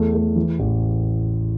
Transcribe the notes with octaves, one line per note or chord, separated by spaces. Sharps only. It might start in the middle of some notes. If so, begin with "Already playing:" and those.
Already playing: E2 A3
A3
E3
A1